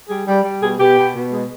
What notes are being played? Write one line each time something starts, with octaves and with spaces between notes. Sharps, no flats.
G3 G#4
G3
G3
B2 G#4
B2 G4
B2
B2
G#3